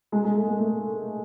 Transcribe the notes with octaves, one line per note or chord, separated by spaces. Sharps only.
G#3
G#3
A3
A#3
A3